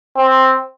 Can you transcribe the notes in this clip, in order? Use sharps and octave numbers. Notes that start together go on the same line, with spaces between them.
C4